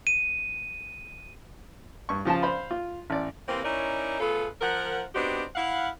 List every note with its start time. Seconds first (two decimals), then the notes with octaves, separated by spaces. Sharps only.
0.07 D#7
2.09 G2 C#6
2.25 C#3 F3 F4 A5
2.42 C5 F5 B5 C6
2.71 F4
3.10 A1 D5
3.48 C3 E3 A#3 C4
3.64 C#4 D#4 E4 A#4 C#5 D5
4.20 A3 B3 F4 G#4 A4
4.61 F3 A#4 F#5
5.15 B3 C4 D4 D#4 F#4 G4
5.55 E4 F5 F#5